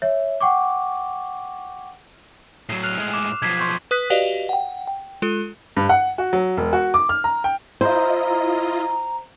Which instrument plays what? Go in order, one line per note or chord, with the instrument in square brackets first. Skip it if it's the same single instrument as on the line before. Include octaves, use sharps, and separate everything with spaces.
[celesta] C#5 E5
F#5 G5 C#6 D6
[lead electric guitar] A2 F#3 [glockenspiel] C7
[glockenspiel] F6 F#6 F7
[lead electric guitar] A2 G#3
[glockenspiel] D6 E7
[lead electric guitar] B1 F3 [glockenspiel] G#6 B6 C7
[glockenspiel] C6 C#6 G6
[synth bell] B4 D#6 F#6 B6
F#4 G4 B4 D5 D#5 F5
F#5 G5
G5
G#3 F4 A4
[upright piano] G2
F#5
F#4
F#3
E1
F#4
D6
F6
A#5
G5
[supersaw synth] E4 F4 D#5 [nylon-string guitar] C5 [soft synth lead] A#5